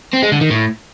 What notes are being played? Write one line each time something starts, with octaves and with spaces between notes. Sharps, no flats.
C4
G#3
D3
D#3
A2